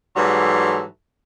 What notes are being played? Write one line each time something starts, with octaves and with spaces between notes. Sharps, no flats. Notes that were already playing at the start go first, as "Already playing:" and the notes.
G#2 E3 F#3 G3 A4 C6